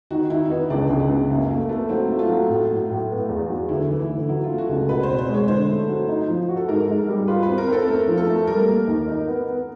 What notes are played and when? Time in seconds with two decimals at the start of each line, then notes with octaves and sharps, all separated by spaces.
0.11 D#3 F#4
0.30 D#3 E4
0.45 E4
0.50 B3 D#4
0.70 C#2 D4
0.89 C#2
1.00 B3
1.10 C#3
1.29 F#2 A#3
1.50 A3 A#3
1.69 A3 B3
1.89 F#3 C4
2.09 A3
2.19 F4
2.29 F#3
2.49 A2
2.69 F#3
2.90 A2
3.10 B3
3.29 E2
3.49 F#3
3.69 D2 E4
3.89 E3
3.99 E4
4.09 D2
4.29 F#3 E4
4.44 F4
4.49 A3
4.58 F#4
4.69 C#2
4.89 B2 B4
5.03 C5
5.09 C4
5.18 C5
5.29 G#3
5.34 C#5
5.48 D3 C5
5.69 A3
5.89 F#3
6.09 D#4
6.28 F3
6.49 F#4
6.56 A4
6.68 G#2 A#4
6.88 G#2
6.98 A#4
7.09 G3
7.28 F4 B4
7.43 B4
7.48 C4
7.58 A#4
7.68 C4 A4
7.88 A3 A#4
8.08 F3
8.18 A4
8.27 A3
8.47 G3 A#4
8.67 A#3
8.87 D#2
9.08 D#4
9.27 B3
9.47 B3